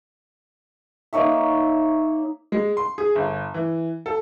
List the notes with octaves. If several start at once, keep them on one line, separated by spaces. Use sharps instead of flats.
A#3 D#4 C#5 E5
G#3
C6
G#4
G1
E3
A4